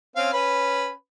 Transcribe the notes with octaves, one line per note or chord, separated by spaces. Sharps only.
C4 C#4 F5
C#4 B4 B5